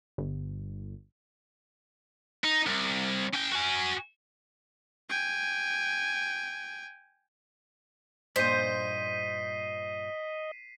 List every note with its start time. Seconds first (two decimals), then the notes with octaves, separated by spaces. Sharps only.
0.18 G1
2.44 D#4
2.66 C2
3.34 C#4 G5
3.52 F#4 G#5
5.09 G5 G#5
8.36 G2 A#2 C5 D#5 B6 C7 D#7